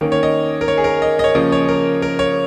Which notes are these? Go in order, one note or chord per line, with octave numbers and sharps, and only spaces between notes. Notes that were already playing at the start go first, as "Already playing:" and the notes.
D#3 A#3 C#4 A#4
C#5
D#5
A#4
C#5
G#4
A#4
D#5
D#5
C#5
C#3 F3 A#3 C#4 D#5
C#5
A#4
A#4
C#5